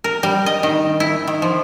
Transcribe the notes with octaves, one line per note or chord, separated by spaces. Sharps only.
A#4
G3
D#5
D#3
E4
D#3
F3